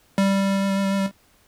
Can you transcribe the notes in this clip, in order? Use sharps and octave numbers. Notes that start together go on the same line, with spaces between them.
G3